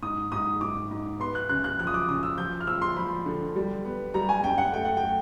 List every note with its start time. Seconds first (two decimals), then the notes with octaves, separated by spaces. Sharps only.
0.02 G#2 D#6
0.32 G#2 D#6
0.61 G#2 D6
0.91 G#2
1.20 B3 C6
1.35 F#6
1.49 C#3 F#6
1.64 F#6
1.79 F3 F#6
1.87 D#6
1.94 D6
2.08 C#3 D#6
2.23 E6
2.38 F3 G6
2.60 F6
2.67 F3 E6
2.82 C6
2.96 F3 B5
3.26 D3
3.56 G3
3.85 B3
4.14 G3 A#5
4.29 G#5
4.44 F#2 G5
4.58 F#5
4.73 A3 G5
4.85 F#5
4.97 G5
5.03 A3